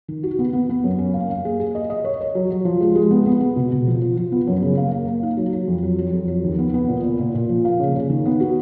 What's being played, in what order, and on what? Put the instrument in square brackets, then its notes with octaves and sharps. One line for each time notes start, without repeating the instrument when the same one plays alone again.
[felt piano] D#3
F#4
B3
B3
B3
F#2
C#4
A#3
A#3
G#4
G#4
D#5
D#5
C#5
C#5
F#3
F#3
F3
G#3
G#3
B3
B3
B3
B2
B2
F3
F3
F3
B3
F#2
C#3
A#3
A#3
A#3
D#4
F#3
F#3
F2
F#3
F#3
F2
F#3
D#2
B3
B3
A#2
A#2
A#2
A#2
F3
A#3
C#3
C#3
D#3
B3
F#4